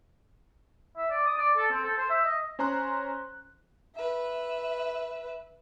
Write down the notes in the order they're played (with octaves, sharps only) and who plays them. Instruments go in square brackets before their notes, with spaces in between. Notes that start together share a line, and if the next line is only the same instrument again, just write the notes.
[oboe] E5
D5
D#6
D5
A4
C4
A4
C5
E5
D#5
[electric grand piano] C#4 C5 A#5 C6 F#6
[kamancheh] B4 E5